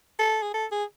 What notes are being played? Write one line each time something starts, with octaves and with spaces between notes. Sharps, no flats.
A4
G#4
A4
G#4